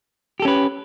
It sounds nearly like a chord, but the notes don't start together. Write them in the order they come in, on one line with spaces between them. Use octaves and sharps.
G4 A4 C#4 B4